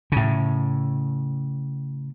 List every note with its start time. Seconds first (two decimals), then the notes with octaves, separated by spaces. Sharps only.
0.12 A2 C#3